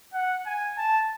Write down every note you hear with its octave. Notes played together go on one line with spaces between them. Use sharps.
F#5
G#5
A5